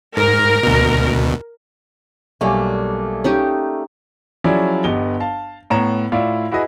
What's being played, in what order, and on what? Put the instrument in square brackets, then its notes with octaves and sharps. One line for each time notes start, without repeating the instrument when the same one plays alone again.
[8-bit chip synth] G#2 [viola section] A#4
[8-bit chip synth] D2 B2
[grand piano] B1 G3 G#5 [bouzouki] A3 A#3 D4
[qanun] C#4 D#4 G4
[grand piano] F3 F#3 C#4 E4 G#4 D5
G1 B3 G4 D#5 G7
F5 A5
A2 B3 C#5 A#5 E7
A2 E4 F4 D5 F5
E4 F#4 G#4 B4 D#5